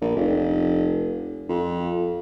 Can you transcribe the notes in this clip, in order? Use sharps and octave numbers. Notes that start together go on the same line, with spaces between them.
A#1
F1
F2